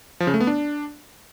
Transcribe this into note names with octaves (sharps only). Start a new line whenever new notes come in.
F3
C#3
A3
B3
D4